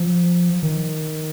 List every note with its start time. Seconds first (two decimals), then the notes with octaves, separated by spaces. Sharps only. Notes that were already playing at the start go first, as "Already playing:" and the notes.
Already playing: F3
0.63 D#3